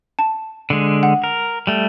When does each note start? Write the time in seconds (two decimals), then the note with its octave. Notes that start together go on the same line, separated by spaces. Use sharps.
0.19 A5
0.70 D3 G#3
1.03 F#5
1.24 A#4
1.67 G3 A3